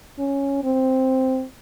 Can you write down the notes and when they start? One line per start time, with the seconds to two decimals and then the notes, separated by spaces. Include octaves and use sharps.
0.19 C#4
0.64 C4